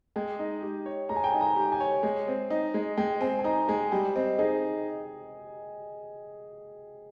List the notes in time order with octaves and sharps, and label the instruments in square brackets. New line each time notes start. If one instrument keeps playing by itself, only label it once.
[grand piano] G#3 [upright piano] G5
[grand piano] D#4
G4
C#5
[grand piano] G#3 [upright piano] A#5
[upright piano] G#5
G5
[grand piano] D#4 [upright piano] G#5
[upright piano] A#5
[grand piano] G4
[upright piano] G#5
[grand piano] C#5
G#3
C4
D#4
G#3
[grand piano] G#3 [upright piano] G5
[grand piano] C4 [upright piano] G#5
[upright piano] G#5
[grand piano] D#4 [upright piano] A#5
[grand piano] G#3 [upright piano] G#5
[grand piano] G3 [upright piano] G5
[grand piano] C4 [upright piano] D#5
[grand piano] D#4 [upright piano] G#4